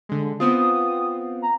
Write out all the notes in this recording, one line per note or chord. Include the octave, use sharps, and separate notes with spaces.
D3 G#3
B3 C4 F4 D#6
A#5